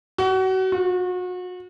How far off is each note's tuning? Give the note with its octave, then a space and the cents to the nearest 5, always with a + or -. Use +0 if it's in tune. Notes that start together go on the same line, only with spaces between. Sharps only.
F#4 +30
F#4 -35